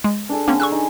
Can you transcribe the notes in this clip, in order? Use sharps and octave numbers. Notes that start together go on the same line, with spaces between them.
G#3
D4 G#4 A4
D3 A#3 C4 C#4
D4 G#4 C#6 E6 F#6
D#4